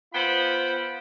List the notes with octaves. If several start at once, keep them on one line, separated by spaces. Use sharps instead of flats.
B3 F4 C5 G5 B5